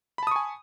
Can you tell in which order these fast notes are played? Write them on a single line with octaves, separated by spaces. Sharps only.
B5 A5 D#6 C#6 G#5